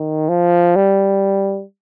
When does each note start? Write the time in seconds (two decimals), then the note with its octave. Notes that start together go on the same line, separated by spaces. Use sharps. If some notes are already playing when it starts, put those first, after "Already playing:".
Already playing: D#3
0.29 F3
0.76 G3